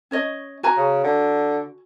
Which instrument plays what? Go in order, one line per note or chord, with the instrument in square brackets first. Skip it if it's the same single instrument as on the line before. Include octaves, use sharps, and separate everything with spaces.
[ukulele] C#4 C#5 D#5
F#4 G#5 A#5
[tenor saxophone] C#3
D3